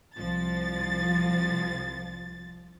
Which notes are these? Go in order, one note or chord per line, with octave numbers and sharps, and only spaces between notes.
C2 F3 A6